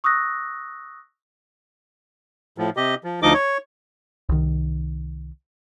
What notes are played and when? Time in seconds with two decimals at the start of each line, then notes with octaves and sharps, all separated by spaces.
0.04 C#6 D#6 E6 F#6 A#6
2.58 A2 F3
2.77 C3 G4 D#5
3.04 F3
3.22 D2 F3 D#4 D#5 D6
3.34 C#5
4.29 C2 D#3